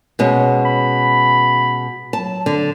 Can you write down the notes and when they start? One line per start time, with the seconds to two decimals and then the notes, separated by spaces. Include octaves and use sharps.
0.19 B2 G#3 C#4
0.65 B5
2.13 F#3 A5
2.46 D3